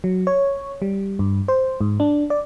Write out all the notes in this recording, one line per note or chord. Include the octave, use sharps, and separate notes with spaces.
F#3
C#5
G3
G2
C5
G#2
D4
D5